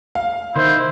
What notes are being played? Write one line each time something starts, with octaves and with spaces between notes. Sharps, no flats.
F5
D#3 E4 C5